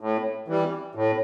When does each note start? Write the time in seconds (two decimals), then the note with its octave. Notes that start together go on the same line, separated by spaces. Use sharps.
0.01 A2
0.48 E3 G3
0.95 A2